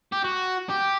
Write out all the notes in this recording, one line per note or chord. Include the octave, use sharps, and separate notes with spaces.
G4
F#4
G4